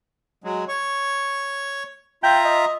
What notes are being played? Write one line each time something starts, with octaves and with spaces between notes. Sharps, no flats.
F#3 G#3
C#5 C#6
F4 E5 G5 A#5
D#5